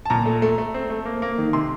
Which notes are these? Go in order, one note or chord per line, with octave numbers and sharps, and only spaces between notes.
A5
A#2 A#5
A3
A3
A3
C4
A3
A#3
A#3
D#3
C3 C6